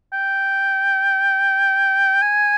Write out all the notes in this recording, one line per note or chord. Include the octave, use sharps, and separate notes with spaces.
G5
G#5